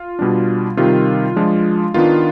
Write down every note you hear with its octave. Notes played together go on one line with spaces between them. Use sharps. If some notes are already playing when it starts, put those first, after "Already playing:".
Already playing: F4
B2 G3 D4
C3 D#3 G3 F4
F3 G#3 D4
D#3 B3 D4 F4